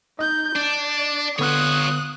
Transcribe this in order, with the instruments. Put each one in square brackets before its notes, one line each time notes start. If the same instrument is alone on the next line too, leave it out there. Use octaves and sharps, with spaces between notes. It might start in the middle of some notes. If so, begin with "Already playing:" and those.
[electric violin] D#4 G6 [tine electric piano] D#5
[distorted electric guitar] D4 [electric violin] D5
[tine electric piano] D3 B3 [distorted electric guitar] F4 C#5 [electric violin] D#6 F#6